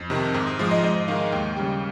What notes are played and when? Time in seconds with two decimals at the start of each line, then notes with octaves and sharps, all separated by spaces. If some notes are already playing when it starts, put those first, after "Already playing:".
Already playing: F2
0.10 C3 D#3
0.34 G#2
0.47 D#6
0.59 F3 G#3 C6
0.71 D#5
0.83 G#2 D#5
1.08 D#3 G#3 F5
1.32 D#2 G5
1.56 C#3 G3